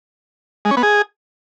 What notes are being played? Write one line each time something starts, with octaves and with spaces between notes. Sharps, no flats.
G#3
C#4
B3
G#4